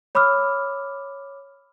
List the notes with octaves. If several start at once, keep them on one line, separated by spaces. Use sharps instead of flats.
C#5 B5 D6 E6 F6